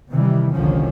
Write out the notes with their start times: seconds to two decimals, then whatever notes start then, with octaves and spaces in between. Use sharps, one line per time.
0.11 C3 D#3 E3 G3
0.53 F#1 C2 D3 D#3 F3 C#4